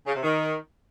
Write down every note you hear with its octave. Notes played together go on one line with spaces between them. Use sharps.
C#3
C3
D#3